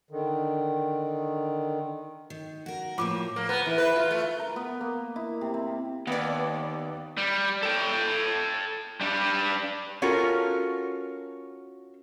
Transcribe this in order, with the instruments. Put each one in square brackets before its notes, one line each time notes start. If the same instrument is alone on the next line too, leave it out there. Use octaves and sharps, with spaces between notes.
[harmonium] D3 D#3
[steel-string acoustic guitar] D#3
F#4 A#4
[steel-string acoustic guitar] A2 F3 A#3 [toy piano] F4 D6
[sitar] A#3
B3
E3
B4
F4
A3
[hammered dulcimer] A#4
B3
A#3
E4
C3
C4
[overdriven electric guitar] D#2 [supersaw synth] B3 D5
[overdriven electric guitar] G3
A4 G5
G3 D4
[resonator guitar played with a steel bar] C#4 F4 F#4 A4 A#4